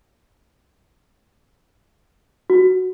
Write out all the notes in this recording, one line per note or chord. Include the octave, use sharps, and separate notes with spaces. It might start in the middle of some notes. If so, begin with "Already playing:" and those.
F#4